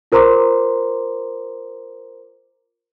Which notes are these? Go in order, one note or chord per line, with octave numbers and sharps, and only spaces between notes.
F4 A#4 C5 A#5 C6 D6